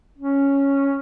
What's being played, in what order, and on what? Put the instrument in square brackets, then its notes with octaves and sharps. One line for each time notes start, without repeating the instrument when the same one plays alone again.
[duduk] C#4